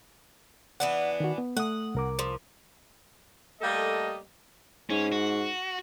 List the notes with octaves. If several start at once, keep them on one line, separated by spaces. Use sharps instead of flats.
E3 B3 D4 F#5
D#3 F#4
B3
A3 F#5 D#6
C2 A#4 D6
F3
G3 A3 A#3 A4 D#5
G#2 C#4
F#4